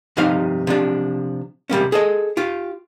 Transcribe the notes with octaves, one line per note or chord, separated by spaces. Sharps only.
G2 C3 F3 D#4 F5 C6
C3 F3 D4
C3 G3 A#3 C#4
G#4 A4 D#5
F4 G4